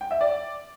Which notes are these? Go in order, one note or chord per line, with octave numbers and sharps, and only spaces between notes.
G5
E5
D5